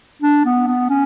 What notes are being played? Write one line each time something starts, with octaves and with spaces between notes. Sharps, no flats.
D4
B3
B3
C#4